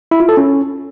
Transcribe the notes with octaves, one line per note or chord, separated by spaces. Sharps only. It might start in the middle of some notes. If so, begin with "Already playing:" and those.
E4
F4
A4
C#4